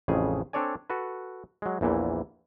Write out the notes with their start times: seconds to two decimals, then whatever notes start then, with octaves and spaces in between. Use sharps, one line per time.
0.08 A1 F2 C#3 G#4
0.53 C4 D4 A4 C#5 D5 G#5
0.90 F#4 A4 B4
1.62 F#3 G#3
1.81 A#1 E2 A#2 E3